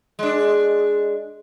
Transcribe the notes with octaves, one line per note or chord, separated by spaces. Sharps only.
G#3 D4